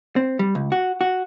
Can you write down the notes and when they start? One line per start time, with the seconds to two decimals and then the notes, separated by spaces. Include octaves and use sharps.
0.16 C4
0.39 G3
0.55 C#2
0.72 F#4
1.01 F#4